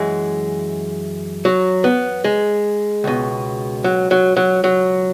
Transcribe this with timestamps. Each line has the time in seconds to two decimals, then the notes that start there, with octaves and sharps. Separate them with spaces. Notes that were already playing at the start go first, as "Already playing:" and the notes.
Already playing: F#2 E3 G#3
1.45 F#3
1.84 B3
2.24 G#3
3.04 C#2 B2
3.84 F#3
4.11 F#3
4.36 F#3
4.64 F#3